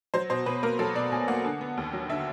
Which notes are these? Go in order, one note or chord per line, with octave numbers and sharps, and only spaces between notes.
F#3 C5
B2 C5
B2 B4
A#3 A#4
F#3 A4
B2 D5
B2 G#5
A#3 F#5
D3
B3
D#2
F#3
D3 E5